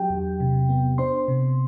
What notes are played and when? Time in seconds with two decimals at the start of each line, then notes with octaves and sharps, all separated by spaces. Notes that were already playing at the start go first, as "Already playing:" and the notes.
Already playing: F#3 D4 G4 G5
0.10 E2
0.40 C3
0.69 B3
0.98 D4 C5 C6
1.28 C3